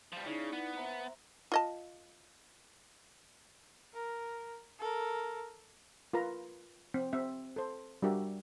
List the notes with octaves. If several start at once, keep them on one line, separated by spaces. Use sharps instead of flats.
F3 G3
C#3 D#4 E4 D5
B3
C5 E5 A#5
F4 D#5 A5
A#4
A4 A#4
F4 A#4 B4 A#5
C4
C4 E5
A4 C5
G3 D4 F#4 G4 A#4 E5